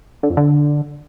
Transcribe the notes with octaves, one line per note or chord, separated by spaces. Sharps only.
D3
F2
D3